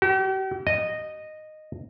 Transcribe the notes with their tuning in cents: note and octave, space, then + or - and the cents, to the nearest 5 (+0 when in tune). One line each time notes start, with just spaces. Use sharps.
G4 -45
D#5 -10